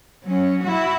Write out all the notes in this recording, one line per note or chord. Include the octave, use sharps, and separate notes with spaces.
F#3 C#4
E4 F#4